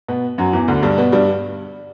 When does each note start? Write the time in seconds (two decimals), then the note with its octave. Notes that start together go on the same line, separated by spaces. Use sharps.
0.08 B2 B3
0.38 F#2 F#3
0.53 E2 E3
0.68 D2 D3
0.83 G2 G3
0.98 B2 B3
1.12 G2 G3